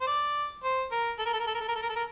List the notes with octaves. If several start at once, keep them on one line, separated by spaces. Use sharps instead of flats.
C5
D5
C5
A#4
A4
A#4
A4
A#4
A4
A#4
A4
A#4
A4
A#4
A4
A#4